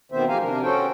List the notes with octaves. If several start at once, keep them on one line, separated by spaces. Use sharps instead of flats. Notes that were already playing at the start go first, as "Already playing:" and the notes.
B2 D#3 B3 C4 C5 E5
F3 A3 G4 F5 G#5 A#5
C3 D4 A#4
C#4 F#4 A4 C5 G5